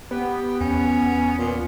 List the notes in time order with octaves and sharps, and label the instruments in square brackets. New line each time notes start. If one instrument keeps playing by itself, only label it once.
[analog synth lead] B3 [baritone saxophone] G4
[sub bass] E2 [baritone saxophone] C#4
[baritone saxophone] A#2